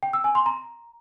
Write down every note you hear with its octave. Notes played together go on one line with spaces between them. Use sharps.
G5
E6
G#5
C6
A#5